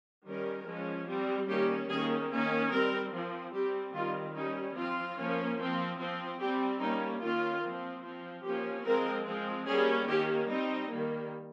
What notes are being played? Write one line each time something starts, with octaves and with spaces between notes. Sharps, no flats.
D#3 G3 C#4 A#4
F3 G#3 C#4
G3 C4
D#3 G3 A#3 C#4 G4
D#3 A#3 C#4 G#4
D#3 A#3 C#4
G3 C4 A#4
F3 C4
G3 C4 G4
D#3 G3 C4 F4
G3 C#4 D#4
F3 C4 F4
F3 A#3 C#4
F3 C4
F3 C4
G3 C4 G4
G3 A#3 C#4 D#4
D#3 A#3 C#4 F4
F3 C4
F3 C4
F3 A#3 C#4 G4
F3 G#3 C4 A#4
F3 G#3 C4
G3 A#3 C#4 G#4
D#3 A#3 C#4 G4
G3 C4 D#4
D#3 G3 A#3